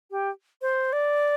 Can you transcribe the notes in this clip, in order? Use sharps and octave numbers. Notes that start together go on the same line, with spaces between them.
G4
C5
D5